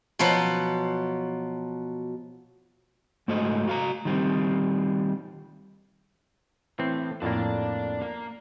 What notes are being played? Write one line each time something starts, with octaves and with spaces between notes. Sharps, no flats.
B2 F3 F#3 B3
G#2 A3 F#4 A4 C5 D#5
F#4 F5 A#5
D#3 G3 C4
A2 E3 C4
F2 A2 A#3 D4 D5
A#3